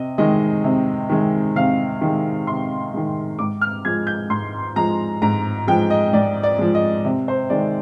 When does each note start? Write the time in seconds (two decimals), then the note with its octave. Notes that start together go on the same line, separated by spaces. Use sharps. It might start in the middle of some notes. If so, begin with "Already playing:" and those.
Already playing: C3 D#5
0.18 D#3 G#3 D#5
0.64 C3
1.09 D#3 G#3
1.56 C3 F5
2.01 D#3 G#3
2.47 C3 C6
2.94 D#3 G#3
3.39 G#2 D6
3.61 F6
3.85 F3 G#3 G#6
4.07 G6
4.30 G#2 C6
4.76 F3 G#3 A#5
5.22 G#2 A#5
5.67 F3 G#3 G5
5.90 D#5
6.13 G#2 D5
6.43 D5
6.58 F3 G#3
6.75 D#5
7.05 C3
7.28 C5
7.50 D#3 G#3 D5